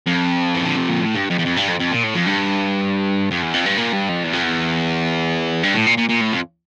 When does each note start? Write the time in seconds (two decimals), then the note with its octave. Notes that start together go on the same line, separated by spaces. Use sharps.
0.07 F2
0.55 E3
0.65 D3
0.77 C3
0.88 A#2
0.99 A2
1.15 G2
1.30 F2
1.39 E2
1.46 F2
1.57 G2
1.69 F2
1.80 F2
1.92 A#2
2.04 A2
2.15 F2
2.27 G2
3.31 F2
3.43 E2
3.54 F2
3.66 G2
3.78 A#2
3.93 G2
4.09 F2
4.24 E2
4.33 F2
4.42 E2
5.63 G2
5.75 A2
5.86 A#2
5.98 A#2
6.09 A#2
6.21 A2
6.33 F2